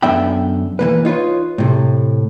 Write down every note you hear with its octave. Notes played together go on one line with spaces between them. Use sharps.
F#2 D3 B3 E5 G5 B5
E3 A#3 B4
D#4 F4 B4 C#5
A2 C3